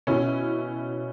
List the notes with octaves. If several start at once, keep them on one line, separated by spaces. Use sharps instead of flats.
B2 C#4 E4